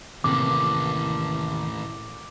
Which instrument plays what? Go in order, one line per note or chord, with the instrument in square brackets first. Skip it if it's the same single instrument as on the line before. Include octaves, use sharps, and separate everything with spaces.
[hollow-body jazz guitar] D#2 C3 A#3 [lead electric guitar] A2 E3 [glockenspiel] D6